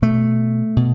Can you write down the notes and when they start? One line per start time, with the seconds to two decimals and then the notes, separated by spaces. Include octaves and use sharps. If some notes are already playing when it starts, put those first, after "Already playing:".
0.02 B2 A3
0.76 B2